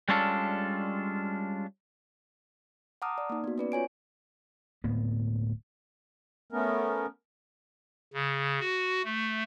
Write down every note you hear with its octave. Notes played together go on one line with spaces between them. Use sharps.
G3 G#3 C#4 D4 F4 A4
F#5 A5 A#5 D6 D#6 F6
D5
A#3 D#4
B3 F#4
C#4 B4 D5
F4 C#5 G#5 D7
D1 A2 A#3 B3
A3 B3 C#4 A#4
C#3
F#4
A3